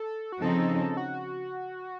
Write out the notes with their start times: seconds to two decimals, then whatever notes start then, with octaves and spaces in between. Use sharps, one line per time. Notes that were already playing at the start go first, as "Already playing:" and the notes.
Already playing: A4
0.32 F#4
0.41 C#3 F3 C4 D#4 A4
0.97 F#4